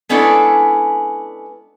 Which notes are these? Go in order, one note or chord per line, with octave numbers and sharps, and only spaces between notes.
G#3 B3 C#4 D4 E4 A4